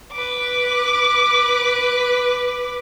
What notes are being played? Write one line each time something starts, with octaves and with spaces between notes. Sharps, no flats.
B4 D6